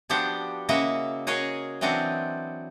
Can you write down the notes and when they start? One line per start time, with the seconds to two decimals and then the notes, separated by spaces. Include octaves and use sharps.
0.10 F3 B3 D4 F#4 G4 C5
0.69 C#3 A#3 E4 F#4 D#5 E5
1.27 F#4 G#4 A#4 C#5 D#5 F5
1.81 E3 F#3 C4 D4 F#4 D#5